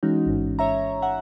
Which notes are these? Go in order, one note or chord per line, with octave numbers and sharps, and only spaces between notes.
E3 G#3 C#4 D#4 F#4
A1 G#2
C#5 E5 A#5
E5 F#5